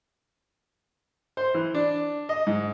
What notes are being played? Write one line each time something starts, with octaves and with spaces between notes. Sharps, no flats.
C5
E3
D4
D#5
G#2